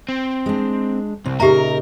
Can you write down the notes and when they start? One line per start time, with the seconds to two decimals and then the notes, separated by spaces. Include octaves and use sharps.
0.09 C4
0.46 G#3 D4
1.25 C2 C4
1.40 A#2 C#3 D#4 G4 A#4 E5 A#5